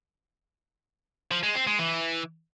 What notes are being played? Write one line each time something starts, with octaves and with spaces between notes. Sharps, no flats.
F3
G#3
C4
G#3
E3